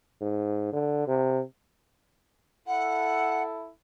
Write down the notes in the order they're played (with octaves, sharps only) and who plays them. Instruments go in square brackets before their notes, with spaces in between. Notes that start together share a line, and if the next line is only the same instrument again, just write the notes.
[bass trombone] G#2
D3
C3
[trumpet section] E4 A4 [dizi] F#5